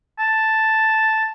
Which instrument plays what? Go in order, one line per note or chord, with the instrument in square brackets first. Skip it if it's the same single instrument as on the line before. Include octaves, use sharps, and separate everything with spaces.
[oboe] A5